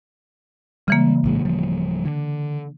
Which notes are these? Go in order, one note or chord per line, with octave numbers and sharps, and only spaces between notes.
C#3 E3 G3 G#3 A#3
A#1 A2 G#3
D1 F3 G3
D3